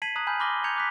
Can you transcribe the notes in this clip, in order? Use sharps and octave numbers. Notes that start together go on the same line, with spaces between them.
A5 G#6 B6 C7 D#7 F#7
A5 A#5 D#6 F#6 G#6 F#7
G#5 A5 B5 F6 G6
B5 C6 D6 F6 A#6 G7
A#5 B5 G6 G#6 C#7 F7
D6 F#6 B6